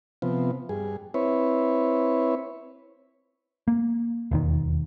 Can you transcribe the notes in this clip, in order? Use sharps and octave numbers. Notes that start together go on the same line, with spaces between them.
C3 F3 B3
G2 G#4
C4 E4 B4 C#5
A#3
E1 D#2 D#3